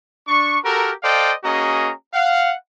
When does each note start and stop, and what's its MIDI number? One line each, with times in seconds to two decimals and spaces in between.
0.28 0.58 62
0.28 0.58 85
0.64 0.91 66
0.64 0.91 67
0.64 0.91 69
0.64 0.91 70
1.03 1.32 69
1.03 1.32 72
1.03 1.32 74
1.03 1.32 75
1.03 1.32 77
1.03 1.32 79
1.43 1.90 58
1.43 1.90 61
1.43 1.90 66
1.43 1.90 68
1.43 1.90 75
1.43 1.90 82
2.13 2.53 77
2.13 2.53 78